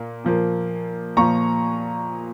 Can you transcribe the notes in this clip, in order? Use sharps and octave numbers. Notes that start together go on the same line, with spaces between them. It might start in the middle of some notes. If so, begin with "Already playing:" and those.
Already playing: A#2 A#3
A#2 F3 A#3
A#2 F3 A#5 C#6